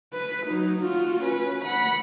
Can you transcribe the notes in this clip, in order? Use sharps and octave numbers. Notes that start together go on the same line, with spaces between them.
B4
F#3 D#4
F4 F#4
C#4 B4
F#5 B5